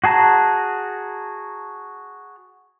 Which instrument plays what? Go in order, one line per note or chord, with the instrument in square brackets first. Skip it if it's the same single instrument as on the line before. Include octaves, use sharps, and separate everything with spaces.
[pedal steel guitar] F#4 G#4 A5 A#5